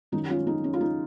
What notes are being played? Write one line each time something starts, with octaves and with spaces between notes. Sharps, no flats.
F#2 D#3 F#3 D#4
C#4 F4
D#4
C#4
F4
D#4